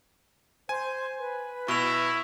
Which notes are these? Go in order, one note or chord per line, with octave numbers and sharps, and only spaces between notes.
C5 G#5
B4
B2 E4 C#6 F7